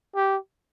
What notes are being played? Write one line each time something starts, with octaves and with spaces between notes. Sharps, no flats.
G4